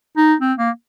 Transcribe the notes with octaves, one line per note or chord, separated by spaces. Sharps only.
D#4
C4
A#3